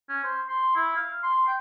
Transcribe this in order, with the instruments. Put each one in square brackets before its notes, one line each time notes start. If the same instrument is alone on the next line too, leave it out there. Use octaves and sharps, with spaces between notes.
[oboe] C#4
C5
C6
E4
F5
C6
G5